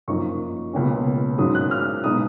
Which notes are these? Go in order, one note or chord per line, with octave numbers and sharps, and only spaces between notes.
F#2 F3 A#3 D#4 C#6
C#2 B2 A#3 C#4
G#2 D#3 F#3 C#4 D#6
F#6
F6
B2 G#3 D#4 D#6